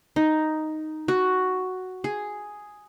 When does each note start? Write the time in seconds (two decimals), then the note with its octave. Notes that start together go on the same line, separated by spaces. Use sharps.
0.16 D#4
1.08 F#4
2.04 G#4